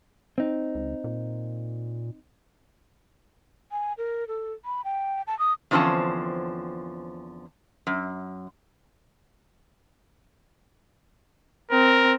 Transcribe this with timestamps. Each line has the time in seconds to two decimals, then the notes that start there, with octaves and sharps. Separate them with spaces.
0.38 C4 D#4
0.75 C#2
1.04 A#2
3.72 G#5
3.98 A#4
4.28 A4
4.65 B5
4.85 G5
5.27 A5
5.39 D#6
5.71 E2 D3 F3 C4 C#4 A5
7.87 F#2
11.71 C4 A#4